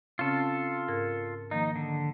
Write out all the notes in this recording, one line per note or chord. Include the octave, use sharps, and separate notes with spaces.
C#3 C4 C#4 F4 A4
G#2 A#4 G#6
D#3 F3 A#3 D#4
D3